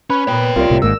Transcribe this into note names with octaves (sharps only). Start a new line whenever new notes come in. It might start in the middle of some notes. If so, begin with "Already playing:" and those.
C#4 B4
A#2 B3 C#5 G5
C2 C3 F4 A#4 D5
C2 A2 C3
G#1 G#2 A#3 E6